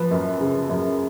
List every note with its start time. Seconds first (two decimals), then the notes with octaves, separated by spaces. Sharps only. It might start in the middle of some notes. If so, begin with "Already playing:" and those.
Already playing: F3 B4
0.11 F#2
0.41 C#3
0.70 F#2